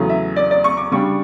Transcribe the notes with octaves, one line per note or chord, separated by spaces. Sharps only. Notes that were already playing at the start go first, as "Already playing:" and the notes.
Already playing: E2 C#3 F#3 A3
E5
D5
D5
C#6
D6
C#3 G3 D4 C#6